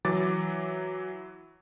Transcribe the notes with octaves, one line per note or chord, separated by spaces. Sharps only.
E3 F#3 D6 A6